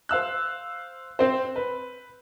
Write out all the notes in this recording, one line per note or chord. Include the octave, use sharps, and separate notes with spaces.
C5 F5 E6 F#6
C4 C5
B4